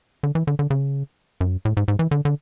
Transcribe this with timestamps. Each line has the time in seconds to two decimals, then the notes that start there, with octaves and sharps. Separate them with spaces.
0.23 D3
0.35 E3
0.47 D3
0.59 D3
0.70 C#3
1.41 F#2
1.65 A2
1.77 G#2
1.88 G#2
1.99 E3
2.11 D3
2.25 D3